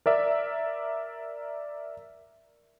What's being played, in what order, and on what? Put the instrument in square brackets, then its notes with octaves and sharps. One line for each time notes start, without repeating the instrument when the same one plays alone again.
[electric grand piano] A#4 D5 E5